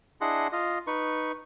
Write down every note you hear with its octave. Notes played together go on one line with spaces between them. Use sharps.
D4 E4 G#4 D#5 F#5 C6
F4 D#5
D#4 B4 C#6